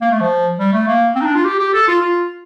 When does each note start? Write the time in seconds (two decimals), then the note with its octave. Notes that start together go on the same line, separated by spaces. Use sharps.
0.01 A#3
0.12 A3
0.20 F3
0.59 G3
0.74 A3
0.88 A#3
1.16 C4
1.21 D#4
1.26 D4
1.35 F4
1.45 G4
1.59 G4
1.74 A4
1.88 F4
2.01 F4